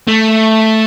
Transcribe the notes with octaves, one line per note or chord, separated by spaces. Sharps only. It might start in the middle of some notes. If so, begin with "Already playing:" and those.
A3